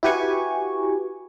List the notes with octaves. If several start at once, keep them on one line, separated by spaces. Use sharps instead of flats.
E4 F#4 G4 B4 G#5 C#6